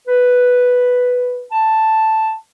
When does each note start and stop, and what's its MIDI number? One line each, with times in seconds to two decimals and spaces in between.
0.08 1.44 71
1.52 2.34 81